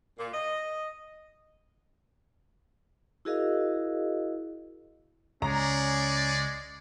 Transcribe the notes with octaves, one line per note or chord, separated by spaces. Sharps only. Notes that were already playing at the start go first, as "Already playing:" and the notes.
A#2
D#5
E4 F#4 G#4 A#4 D#5 F5
C#2 G#3 C#4 D5 A#5